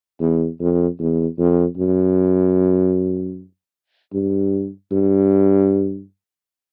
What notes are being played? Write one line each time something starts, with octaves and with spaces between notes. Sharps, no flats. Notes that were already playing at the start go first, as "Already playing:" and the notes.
E2
F2
E2
F2
F#2
G2
G2